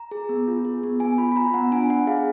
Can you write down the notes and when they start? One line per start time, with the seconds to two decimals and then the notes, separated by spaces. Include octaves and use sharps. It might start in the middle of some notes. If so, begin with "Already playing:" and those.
Already playing: A#5
0.11 G#4
0.29 B3
0.48 F4
0.65 G#4
0.83 B3
1.00 B3 G#5
1.18 F4 B5
1.32 B5
1.36 F4 A#5
1.54 B3 F#5
1.72 D4 G#5
1.90 D4 F#5
2.07 G#4 F5